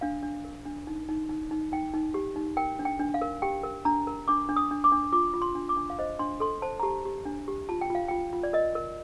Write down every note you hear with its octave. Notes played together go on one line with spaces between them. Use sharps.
D4 F5
D4
A#4
D4
D#4
D#4
D#4
D#4
D#4 G5
D#4
G4
D#4
A#4 G5
D4
G5
D4
F5
A#4
G4 G5
A#4
D4 A#5
A#4
D4 D6
D4
D#6
D4
D6
D4
F4 D6
F4
C6
D4
D6
D4
F5
C5 D#5
D4 C6
A4 C6
C5 A5
A#5
G4 A5
G4
D4
G4
F4 A5
G5
F4 F5
F4 G5
F4
D5
A#4 D#5
A#4